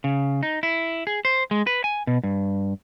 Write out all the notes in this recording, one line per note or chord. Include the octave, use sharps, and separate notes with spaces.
C#3
D#4
E4
G#4
C5
G#3
B4
G#5
B2
G2